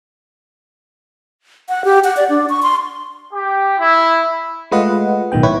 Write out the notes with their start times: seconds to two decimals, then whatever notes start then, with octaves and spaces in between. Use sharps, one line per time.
1.69 F#5
1.85 G4
2.04 F#5
2.17 D5
2.30 D4
2.49 C#6
2.63 C6
3.32 G4
3.78 E4
4.71 G#3 A3 F4 B4 D#5 F#5
5.32 B1 A2 D#3 B3 G5
5.43 E4 B4 C#5